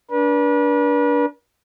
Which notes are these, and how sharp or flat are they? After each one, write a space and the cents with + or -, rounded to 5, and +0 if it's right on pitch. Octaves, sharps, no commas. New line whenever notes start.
D4 -20 B4 -40